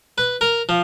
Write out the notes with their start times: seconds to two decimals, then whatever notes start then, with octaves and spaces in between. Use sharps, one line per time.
0.18 B4
0.41 A#4
0.69 F3